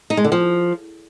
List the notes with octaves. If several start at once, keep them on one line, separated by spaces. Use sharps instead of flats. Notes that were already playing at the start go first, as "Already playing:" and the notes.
D#4
G#3
D3
F3